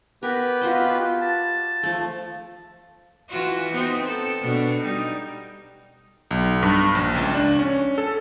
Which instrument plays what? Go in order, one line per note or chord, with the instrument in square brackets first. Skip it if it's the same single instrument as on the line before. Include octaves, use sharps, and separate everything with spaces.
[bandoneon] B3 G4 B4 [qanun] A#4
[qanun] F4 F#4 D#5
[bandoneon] A5
[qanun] F3 A3
[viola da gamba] E3 F4 F#4
B3 C4 D#4
A4
B2 D4
G3 D#4
[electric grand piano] B1
G2
A#1
C#2
D4
C#4
A4